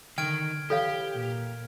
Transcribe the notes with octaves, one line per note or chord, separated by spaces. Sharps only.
D3 D#3 G5 F6 G#6 D7
E3 G4 A4 C#5 F5
A#2 A#3